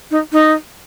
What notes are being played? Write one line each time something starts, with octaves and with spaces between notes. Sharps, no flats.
D#4
D#4